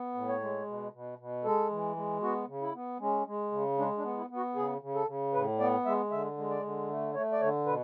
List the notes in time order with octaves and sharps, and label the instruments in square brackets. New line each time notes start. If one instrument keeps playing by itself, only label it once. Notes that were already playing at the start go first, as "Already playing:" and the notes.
Already playing: [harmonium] B3
A2
C#5
G#3
B2
B2
B2
G#3 A4
E3
G#3
B3 F#4
C#3
E4
B3
G#3 C#4
G#3
C#3
G#3 D4
D4
B3
E4
B3
F#4
C#3 G#4
C#3
A4
C#3
A2 B4
B3 D5
G#3 E5
D3 E5
G#3
D5
D3
A3
A3 C#5
D5
D3 C#5
B2 B4